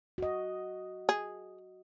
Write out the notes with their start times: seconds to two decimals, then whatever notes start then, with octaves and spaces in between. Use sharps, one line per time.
0.18 F#4 D#5
1.09 G#4